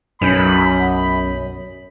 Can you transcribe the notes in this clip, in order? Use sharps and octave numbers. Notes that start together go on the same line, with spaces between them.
B1 F#2 C#4 D#5 B5 G6